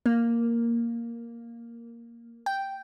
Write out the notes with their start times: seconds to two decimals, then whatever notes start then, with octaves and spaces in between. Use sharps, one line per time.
0.06 A#3
2.46 G5